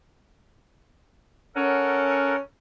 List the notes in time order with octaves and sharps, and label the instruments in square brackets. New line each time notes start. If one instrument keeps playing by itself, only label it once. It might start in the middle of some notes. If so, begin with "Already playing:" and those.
[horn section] C#4 [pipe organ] A4 A#4 F#5